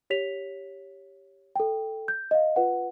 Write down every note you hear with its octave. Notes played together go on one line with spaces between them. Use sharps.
G4 C#5 B6 F7
A4 G5
G6
D#5 F5
F4 B4 F#5